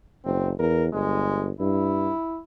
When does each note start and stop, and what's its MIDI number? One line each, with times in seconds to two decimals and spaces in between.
0.25 0.52 30
0.25 0.49 60
0.59 0.91 40
0.59 0.85 70
0.93 1.51 31
0.93 1.48 56
1.60 2.11 43
1.60 2.39 64